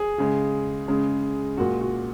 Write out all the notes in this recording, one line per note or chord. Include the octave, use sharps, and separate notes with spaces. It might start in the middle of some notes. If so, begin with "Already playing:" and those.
Already playing: G#4
C#3 G#3
C#3 G#3
A#2 G#3 F#4
F#4